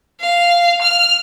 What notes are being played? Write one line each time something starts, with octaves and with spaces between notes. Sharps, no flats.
F5
F6